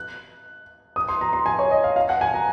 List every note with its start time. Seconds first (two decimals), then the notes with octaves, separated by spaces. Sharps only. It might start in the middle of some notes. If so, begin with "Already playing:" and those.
Already playing: F#6
0.96 D#6
1.09 C6
1.21 A#5
1.33 C6
1.46 G#5
1.59 C#5
1.71 D#5
1.84 F5
1.96 F5
2.09 F#5
2.21 G#5
2.34 A#5